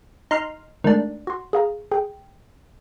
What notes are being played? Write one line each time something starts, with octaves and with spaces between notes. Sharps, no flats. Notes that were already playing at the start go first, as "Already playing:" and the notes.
D#4 C6 F6
D#3 G#3 A3 D4
F#4 C6
G#4 F5 A#5
G#4 G5